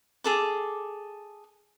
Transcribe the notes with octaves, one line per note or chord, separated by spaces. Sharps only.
G#4 A4 D6